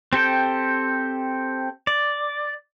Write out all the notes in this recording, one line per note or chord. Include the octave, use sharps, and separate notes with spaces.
C4 G4 A4 G5
D5